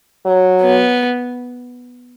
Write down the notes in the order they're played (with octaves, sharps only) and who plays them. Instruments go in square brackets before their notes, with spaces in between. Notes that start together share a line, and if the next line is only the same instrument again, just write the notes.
[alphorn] F#3
[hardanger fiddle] B3